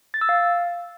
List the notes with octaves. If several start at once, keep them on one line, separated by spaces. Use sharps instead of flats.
A6
E6
F5